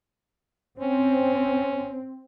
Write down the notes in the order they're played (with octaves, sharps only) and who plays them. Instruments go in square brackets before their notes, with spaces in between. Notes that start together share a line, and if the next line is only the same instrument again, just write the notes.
[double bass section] C4 [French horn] C#4